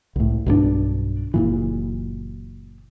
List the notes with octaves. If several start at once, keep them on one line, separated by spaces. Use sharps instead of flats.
C2 A2
B1 G2 F3 D4
F#1 A#2 E3